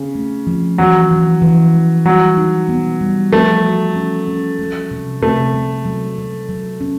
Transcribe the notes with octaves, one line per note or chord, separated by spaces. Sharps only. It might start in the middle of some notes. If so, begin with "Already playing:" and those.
Already playing: C#3
A3
F3
E3 F#3
E3
E3
G#3
F#3 G3
D#4
B3
G3
F3 A3
F#4
C#4
C#4
G#3
C3
C3 A3
G#3
F#3
F#3
F#3
C#4